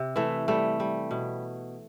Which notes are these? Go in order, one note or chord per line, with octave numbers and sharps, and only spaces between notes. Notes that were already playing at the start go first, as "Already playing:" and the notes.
Already playing: C3
E3 A3
G3 A3
G3
B2